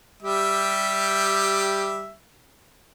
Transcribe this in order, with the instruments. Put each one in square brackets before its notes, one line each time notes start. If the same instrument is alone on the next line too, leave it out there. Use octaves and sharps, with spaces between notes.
[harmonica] G3 G4 E5